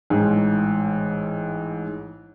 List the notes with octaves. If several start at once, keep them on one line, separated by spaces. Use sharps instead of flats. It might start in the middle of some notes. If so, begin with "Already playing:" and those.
A1 G#2